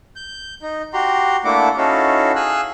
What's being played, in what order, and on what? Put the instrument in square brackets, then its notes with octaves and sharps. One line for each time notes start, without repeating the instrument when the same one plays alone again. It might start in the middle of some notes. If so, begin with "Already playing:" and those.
[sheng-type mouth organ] G6
D#4
F#4 G4 A#5 C6
A3 A#3 D4 E4 F#5 D6
C#4 D#4 E4 F#4 A4 F5
G#4 F5 G#5 E6 F#6